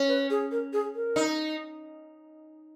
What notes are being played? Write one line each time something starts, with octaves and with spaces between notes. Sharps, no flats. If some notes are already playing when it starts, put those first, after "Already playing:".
Already playing: C#4
B4
G#4
A#4
G#4
A#4
D#4